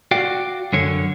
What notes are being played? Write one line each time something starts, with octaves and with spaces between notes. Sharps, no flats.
F#4 D5 F5 G5
F#2 D3 C#5